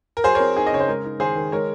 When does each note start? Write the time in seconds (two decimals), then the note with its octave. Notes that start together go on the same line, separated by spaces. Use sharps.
0.17 A#4
0.24 F#3 G#4 C5
0.35 A#4 C#5
0.40 C4
0.56 D#4 G#4
0.67 D#5
0.72 C#3 C#5
0.80 C5
0.88 G#3 A#4
1.04 D#4
1.20 D#3 G#4 C5
1.36 D#3
1.52 G#3 A#4 C#5